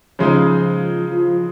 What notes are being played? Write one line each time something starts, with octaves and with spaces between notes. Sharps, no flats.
C#3 F3 G#3 D#4
F3